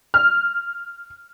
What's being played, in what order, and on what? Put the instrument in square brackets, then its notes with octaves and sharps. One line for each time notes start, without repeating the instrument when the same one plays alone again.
[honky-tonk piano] F6